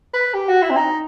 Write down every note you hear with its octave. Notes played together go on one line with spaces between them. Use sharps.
B4
G4
F#4
E4
C4
D#4